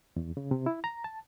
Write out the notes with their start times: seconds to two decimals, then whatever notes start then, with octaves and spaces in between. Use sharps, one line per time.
0.16 E2
0.37 C#3
0.51 C3
0.66 E4
0.84 A#5
1.04 A5